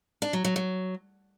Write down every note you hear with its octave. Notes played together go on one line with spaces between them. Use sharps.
D4
F#3
F#3
F#3